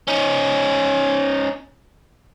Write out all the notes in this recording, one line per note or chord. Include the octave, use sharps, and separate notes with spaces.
C#4 D#4